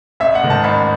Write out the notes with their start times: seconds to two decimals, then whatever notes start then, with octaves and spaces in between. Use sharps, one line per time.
0.20 A1 E5
0.35 F#5
0.42 G#2 D#3
0.50 A5
0.64 A1 B5